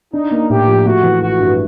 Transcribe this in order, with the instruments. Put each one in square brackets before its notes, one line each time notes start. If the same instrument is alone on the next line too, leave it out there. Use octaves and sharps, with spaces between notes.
[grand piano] D4 [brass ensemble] D#4
[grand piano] A#3
[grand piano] A2 [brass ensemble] G4
[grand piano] F3
[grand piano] A3 [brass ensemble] F#4
[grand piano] E3
[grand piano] A1 [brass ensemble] F#4
[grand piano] G2